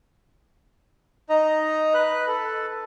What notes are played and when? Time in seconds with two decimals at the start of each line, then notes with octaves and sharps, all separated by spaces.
1.29 D#4 D#5 A#5
1.94 B4 F#6
2.27 A4